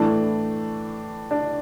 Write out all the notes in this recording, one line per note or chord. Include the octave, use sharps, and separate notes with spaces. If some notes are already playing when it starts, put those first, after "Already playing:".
Already playing: A2 E3 A3 D4
D4